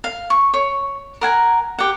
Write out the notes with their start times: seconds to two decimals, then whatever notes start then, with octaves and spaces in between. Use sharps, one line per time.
0.04 F5
0.30 C#6
0.54 C#5
1.21 A#4 F#5 G#5 A#5
1.79 G4 F#5